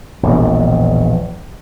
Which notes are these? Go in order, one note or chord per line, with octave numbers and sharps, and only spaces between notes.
E1 A#1 G2